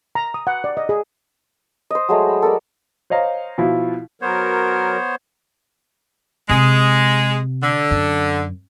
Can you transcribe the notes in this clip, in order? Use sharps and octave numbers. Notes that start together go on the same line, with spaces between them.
A#5
D#6
F#5
D5
D#5
G#4
C5 D#5
F#3 G#3 A3 A#5
B5
A4 A#4 D5
C5 C#5 D#5 F5 A#5
B2 F3 E4 F4
F#3 B3 A#4 C5 C#5
C3 G#3
D3
F#2